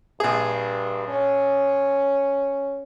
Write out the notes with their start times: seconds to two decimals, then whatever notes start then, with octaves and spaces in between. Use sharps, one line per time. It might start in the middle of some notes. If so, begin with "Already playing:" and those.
0.20 A#1 G2 G#4
1.08 C#4